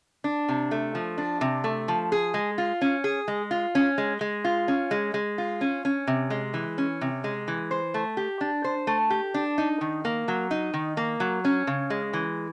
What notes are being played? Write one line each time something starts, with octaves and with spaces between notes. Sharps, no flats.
D4
C3
A3
F3
D4
C3
A3
F3
G#4
G#3
F4
C#4
G#4
G#3
F4
C#4
G#3
G#3
F4
C#4
G#3
G#3
F4
C#4
C#4
C3
G#3
E3
C#4
C3
G#3
E3
C5
A3
G4
D4
C5
A3
G4
D4
D#4
D#3
A#3
F#3
D#4
D#3
A#3
F#3
C#4
C#3
G#3
E3